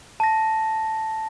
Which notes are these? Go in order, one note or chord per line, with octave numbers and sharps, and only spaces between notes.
A5 A#6